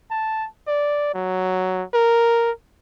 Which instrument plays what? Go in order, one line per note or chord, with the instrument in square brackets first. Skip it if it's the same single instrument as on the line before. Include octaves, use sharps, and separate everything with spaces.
[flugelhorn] A5
D5
F#3
A#4